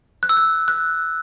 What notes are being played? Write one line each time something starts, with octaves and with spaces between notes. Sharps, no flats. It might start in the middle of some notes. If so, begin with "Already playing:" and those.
F#6
E6
F#6
F#6